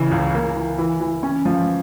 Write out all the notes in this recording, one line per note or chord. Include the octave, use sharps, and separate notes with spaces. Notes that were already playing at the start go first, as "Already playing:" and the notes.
Already playing: C#3 E3
C#2
A#3
E3
E3
E3
C#4
F3